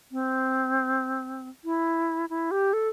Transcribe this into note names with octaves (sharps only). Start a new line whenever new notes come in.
C4
E4
E4
G4
A4